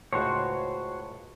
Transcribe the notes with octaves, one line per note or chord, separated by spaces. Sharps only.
C#2 A2 F#4 C5 C#5